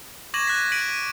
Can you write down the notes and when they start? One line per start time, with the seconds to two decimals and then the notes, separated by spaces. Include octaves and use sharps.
0.34 C#6 D6 G#6 A#6 E7 F#7
0.47 F#6 G#6 B6
0.72 B6 D7 D#7 F#7